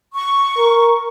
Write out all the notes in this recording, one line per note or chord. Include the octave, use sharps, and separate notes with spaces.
C#6
A#4